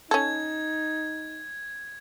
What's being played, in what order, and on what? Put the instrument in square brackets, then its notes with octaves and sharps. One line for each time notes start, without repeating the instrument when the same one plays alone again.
[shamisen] C#4 A4 [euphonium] D#4 [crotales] G#6